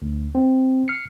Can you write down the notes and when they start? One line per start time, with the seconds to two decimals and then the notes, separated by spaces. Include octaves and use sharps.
0.02 D2
0.35 C4
0.88 F6 C7 C#7